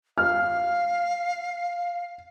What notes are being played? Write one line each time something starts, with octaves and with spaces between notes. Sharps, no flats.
F5 F6